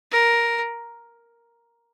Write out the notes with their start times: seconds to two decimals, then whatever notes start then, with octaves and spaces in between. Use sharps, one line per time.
0.11 A#4